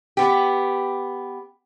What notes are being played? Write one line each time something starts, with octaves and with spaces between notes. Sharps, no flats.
B3 G4